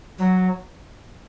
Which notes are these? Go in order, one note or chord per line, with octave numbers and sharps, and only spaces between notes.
F#3